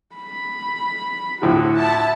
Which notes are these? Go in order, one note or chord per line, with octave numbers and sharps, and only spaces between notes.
B5
D2 A2 F3 F#4
E4 A5